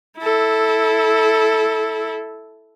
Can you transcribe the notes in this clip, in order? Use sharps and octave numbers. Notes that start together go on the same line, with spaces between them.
E4 A4